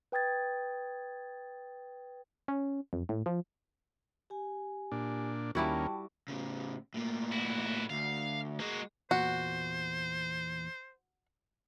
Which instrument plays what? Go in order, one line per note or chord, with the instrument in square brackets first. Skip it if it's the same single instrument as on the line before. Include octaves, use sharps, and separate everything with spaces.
[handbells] B4 G5 D#6 G#6 A6
[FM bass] C#4
F2
A2
F3
[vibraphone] G4 G#5
[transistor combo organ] A#2 D4
[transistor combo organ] D#2 A#3 C#4 [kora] G3 E4 F#4 [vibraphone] G5 A5
[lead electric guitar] A2 C#3
A2 A#3
[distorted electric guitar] E4 F#4
[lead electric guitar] D2 [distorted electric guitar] F5
[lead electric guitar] G#3 [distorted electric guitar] A#3 F#4
[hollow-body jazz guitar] E2 A#2 [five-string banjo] F#4 [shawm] C5